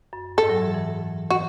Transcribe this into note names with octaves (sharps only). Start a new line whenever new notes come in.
F#2
G#2 A4
F#3
E3
E3
F#4